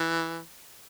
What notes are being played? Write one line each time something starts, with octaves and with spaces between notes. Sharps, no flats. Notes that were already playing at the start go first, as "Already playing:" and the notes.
Already playing: E3